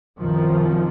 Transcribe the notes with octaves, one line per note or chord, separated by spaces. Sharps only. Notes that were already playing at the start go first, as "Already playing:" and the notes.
C2 F#2 D#3 F3